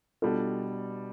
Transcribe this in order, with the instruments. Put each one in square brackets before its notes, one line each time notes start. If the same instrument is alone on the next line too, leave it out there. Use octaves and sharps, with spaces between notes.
[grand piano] B2 G3 D4 [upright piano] F4 A4